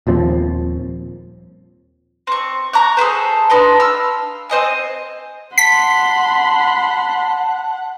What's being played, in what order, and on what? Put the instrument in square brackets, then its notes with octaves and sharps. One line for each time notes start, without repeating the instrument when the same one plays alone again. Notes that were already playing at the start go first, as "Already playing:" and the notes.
[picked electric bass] D#1 D#2 F3 C4
[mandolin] C4 C#6
A#5 C#6 F#6
G#4 A4 B4 C5
D4 D#4 B4 C6
F5 E6
C4 C5 D#5 G#5
[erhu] F#5 [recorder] A5 [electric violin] B5 C6 [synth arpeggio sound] B6